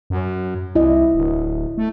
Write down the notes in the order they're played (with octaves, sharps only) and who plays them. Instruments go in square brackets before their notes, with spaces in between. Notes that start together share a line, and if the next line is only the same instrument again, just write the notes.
[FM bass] F#2
[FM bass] C2 [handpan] E4 D#5
[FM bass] D1
A3